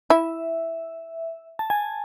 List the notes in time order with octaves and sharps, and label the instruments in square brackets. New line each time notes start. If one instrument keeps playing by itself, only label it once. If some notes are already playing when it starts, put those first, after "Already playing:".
[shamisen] E4 [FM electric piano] E5
[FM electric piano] A5
G#5